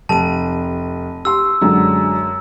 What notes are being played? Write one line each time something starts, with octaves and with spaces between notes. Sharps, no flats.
F1 A5 D#7
G4 C6 E6
F#2 D3 F#3 G#3